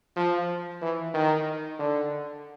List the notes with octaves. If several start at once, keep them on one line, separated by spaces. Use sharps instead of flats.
F3
E3
D#3
D3